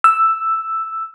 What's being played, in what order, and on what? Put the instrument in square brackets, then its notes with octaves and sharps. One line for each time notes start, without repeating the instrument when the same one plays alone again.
[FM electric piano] E6